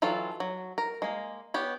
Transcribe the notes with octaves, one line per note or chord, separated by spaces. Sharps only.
E3 F#3 F4 A4
F#3
A#4
G#3 A#3
B3 G4 C#5